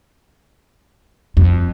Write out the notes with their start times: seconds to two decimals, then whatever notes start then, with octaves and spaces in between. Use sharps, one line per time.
1.37 F2